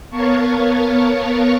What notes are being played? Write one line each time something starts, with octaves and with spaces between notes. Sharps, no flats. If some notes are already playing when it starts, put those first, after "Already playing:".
B3 A#4 C#5 F5 A5 C#6